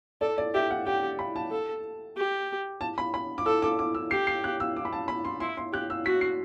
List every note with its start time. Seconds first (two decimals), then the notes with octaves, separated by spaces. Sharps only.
0.21 A4 D5
0.38 D5
0.54 G4 E5
0.71 F#5
0.86 G4 G5
1.19 B5
1.36 A5
1.51 A4
2.17 G4
2.81 A5
2.98 B5
3.14 B5
3.38 D6
3.46 A4 E6
3.62 D6
3.79 D6
3.95 E6
4.11 G4 C7
4.27 C7
4.44 F#6
4.60 E6
4.76 D6
4.85 B5
4.93 A5
5.08 B5
5.25 C6
5.40 E4 C6
5.57 C6
5.73 G4 F#6
5.90 E6
6.06 F#4 B6
6.21 C7